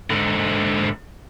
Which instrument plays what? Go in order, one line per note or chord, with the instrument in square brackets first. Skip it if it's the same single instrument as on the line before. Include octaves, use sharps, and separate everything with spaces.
[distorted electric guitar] G#2 D3